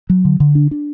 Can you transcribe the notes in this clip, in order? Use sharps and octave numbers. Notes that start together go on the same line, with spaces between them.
F#3
D3
D3
D4
D4